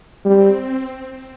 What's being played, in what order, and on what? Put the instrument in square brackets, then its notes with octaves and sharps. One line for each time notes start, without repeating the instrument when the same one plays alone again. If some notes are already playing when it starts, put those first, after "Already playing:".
[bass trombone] G3 [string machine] C4